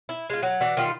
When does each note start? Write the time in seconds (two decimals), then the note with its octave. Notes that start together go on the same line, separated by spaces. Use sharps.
0.09 E4
0.30 G#3 F4
0.43 F#3
0.61 E3 F#4 D5
0.77 D#3 G3 F4